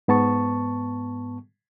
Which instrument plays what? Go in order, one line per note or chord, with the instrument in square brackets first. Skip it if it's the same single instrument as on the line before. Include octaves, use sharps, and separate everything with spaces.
[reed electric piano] G#2 B3 A5 C#6